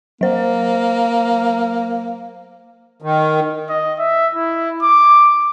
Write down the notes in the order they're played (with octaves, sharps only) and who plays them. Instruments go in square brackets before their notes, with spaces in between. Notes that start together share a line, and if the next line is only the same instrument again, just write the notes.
[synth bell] F#3 C5 [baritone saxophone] A#3
[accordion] D#3
[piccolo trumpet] D#5
E5
E4
D6